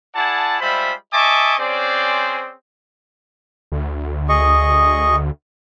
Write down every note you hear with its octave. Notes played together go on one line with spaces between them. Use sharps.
E4 G#4 D5 F#5 A5
G3 G#3 F4 C5 E5 B5
D#5 E5 G#5 A5 C#6 D6
C4 C#4 G#4 C5 D5
D2
G#4 D#5 C#6